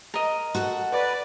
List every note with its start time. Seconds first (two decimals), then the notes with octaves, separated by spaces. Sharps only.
0.14 A#4 D#5
0.55 F#4 A4 F#5
0.92 B4 D5